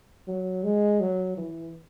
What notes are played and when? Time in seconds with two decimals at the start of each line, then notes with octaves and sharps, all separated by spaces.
0.27 F#3
0.64 G#3
1.00 F#3
1.37 E3